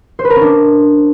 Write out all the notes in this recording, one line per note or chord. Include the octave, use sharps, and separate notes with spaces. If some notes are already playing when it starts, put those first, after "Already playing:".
C5
B4
A#4
C#4
D4